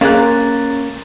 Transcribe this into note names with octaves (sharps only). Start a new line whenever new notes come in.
A#3 C#4 G#4 F5 A#5 C6 F#6 A6